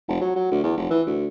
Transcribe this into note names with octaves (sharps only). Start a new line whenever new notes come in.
F1
F#3
F#3
D2
E2
F1
E3
D2